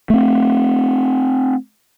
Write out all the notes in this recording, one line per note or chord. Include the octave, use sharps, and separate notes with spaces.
A3 C4